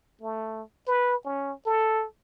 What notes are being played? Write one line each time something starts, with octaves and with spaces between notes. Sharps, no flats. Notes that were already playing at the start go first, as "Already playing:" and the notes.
A3
B4
C#4
A4